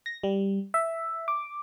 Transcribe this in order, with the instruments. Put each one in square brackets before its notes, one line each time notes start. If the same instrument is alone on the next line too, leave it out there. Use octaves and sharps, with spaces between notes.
[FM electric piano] A#6
G3
E5
D6